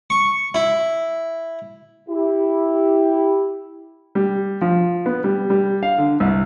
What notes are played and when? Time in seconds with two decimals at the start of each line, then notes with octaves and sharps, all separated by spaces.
0.10 C#6
0.54 E4
2.09 E4 G4
4.15 G3
4.61 F3
5.06 B3
5.24 G3
5.50 G3
5.83 F5
5.98 D3
6.20 C2